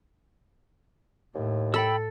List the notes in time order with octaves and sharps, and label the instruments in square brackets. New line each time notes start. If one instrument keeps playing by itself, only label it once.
[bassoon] D#2 [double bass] A2
[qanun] A4 [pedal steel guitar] G5 B5 E6